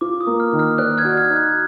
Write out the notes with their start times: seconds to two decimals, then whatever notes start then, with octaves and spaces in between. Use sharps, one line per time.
0.01 F4 D6
0.21 D#6
0.27 A#3
0.40 F6
0.53 D#3
0.59 F6
0.78 D5 F#6
0.98 F6 G#6
1.04 F#4
1.17 F6 G#6
1.30 D#4
1.36 F#6